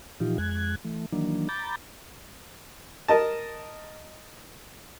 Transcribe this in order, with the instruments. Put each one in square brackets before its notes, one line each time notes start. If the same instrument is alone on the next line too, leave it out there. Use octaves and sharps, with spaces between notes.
[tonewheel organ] A#2 E3 F3 D#4 F4 G4
F2 G#3 F#6 G#6
E3 A3
D#3 E3 F#3 A#3 D4
A#5 B5 D6 G6 A6
[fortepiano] A#4 D#5 A5